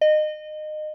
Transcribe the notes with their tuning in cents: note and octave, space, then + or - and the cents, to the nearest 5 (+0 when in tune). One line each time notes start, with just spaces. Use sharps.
D#5 -25